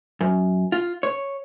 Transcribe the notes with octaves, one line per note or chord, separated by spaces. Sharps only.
F#2
F4
C#5